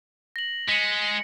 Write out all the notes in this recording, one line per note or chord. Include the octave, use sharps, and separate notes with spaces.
A#6 F#7
G#3 B6 C#7